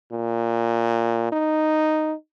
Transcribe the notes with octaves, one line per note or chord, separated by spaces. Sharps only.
A#2
D#4